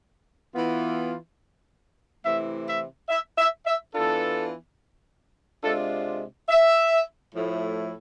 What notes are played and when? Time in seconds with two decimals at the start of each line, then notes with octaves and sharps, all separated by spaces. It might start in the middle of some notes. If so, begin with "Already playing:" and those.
0.54 E3 B3 F4
2.24 C3 E3 A3 E4 E5
2.67 E5
3.09 E5
3.38 E5
3.66 E5
3.94 E3 B3 D4 F4 A4
5.64 C3 G#3 D4 F4 A4
6.49 E5
7.34 A2 F3 A3 E4